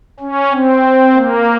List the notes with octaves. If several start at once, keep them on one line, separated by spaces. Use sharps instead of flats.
C#4
C4
A#3